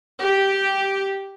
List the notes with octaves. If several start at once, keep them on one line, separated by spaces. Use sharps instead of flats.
G4